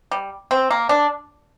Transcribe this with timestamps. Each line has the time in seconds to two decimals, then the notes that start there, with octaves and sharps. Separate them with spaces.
0.11 G3
0.51 C4
0.71 A#3
0.89 D4